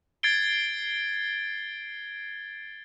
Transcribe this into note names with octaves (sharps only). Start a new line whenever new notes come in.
G#6 A6 C7 D7 G7